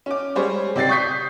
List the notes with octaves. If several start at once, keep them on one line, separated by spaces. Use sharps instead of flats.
C#4 D6
G3 G#3 G#4 C5 C#5
C3 C4 D5 A6 C7
C#6 D#6 G6 B6 C7